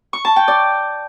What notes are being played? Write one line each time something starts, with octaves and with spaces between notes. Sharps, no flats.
C#6
A5
G5
D5